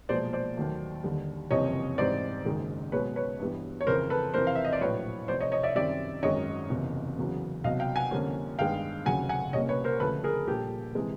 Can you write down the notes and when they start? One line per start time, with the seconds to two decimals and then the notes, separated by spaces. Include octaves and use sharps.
0.09 B1 A#2 F3 G#3 B3 C5 D5
0.33 C5 D5
0.56 D#2 D#3 F#3 A3
1.04 D#2 D3 G3
1.51 F#1 F2 C3 E3 G3 C#5 D#5
1.98 G#2 E3 G3 C4 C5 D5
2.45 F#1 F#2 D#3 G#3
2.92 B1 B2 G#3 B4 C#5
3.16 B4 C#5
3.39 G2 E3 G3 B3
3.81 C#5
3.87 F2 C#3 E3 A#4 C5
4.10 A4 B4
4.34 F2 C3 E3 A#4 C5
4.47 F5
4.55 E5
4.65 D#5
4.73 D5
4.81 A#1 A2 F#3 B4 C#5
5.28 F1 F2 C3 C5 D5
5.40 C#5 D#5
5.52 C#5 D#5
5.63 D5 E5
5.75 F#2 D#3 G3 C4 D5 E5
6.23 G#1 F#2 D#3 G#3 C#5 D#5
6.70 F#1 E2 C3
7.17 E2 C#3 F#3
7.64 C2 B2 F#3 D#5 F5
7.80 F5 G5
7.96 F#5 G#5
8.11 F2 D3 G3 A#3 C#4
8.59 G2 D#3 G#3 B3 F5 G5
9.06 F1 D#2 C#3 F#3 F#5 G#5
9.29 F#5 G#5
9.53 C2 A#2 G3 A#3 C#4 C#5 D#5
9.69 B4 C#5
9.84 A#4 C5
10.00 D2 C#3 F3 A3 A4 B4
10.24 G#4 A#4
10.47 A#1 A#2 G3 G4 A4
10.95 C3 E3 G#3